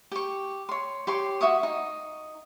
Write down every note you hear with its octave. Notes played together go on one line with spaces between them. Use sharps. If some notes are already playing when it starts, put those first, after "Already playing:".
G4 C#6
C#5 C6
G4 C#5 C6
F#4 E5 C#6 D#6
D#4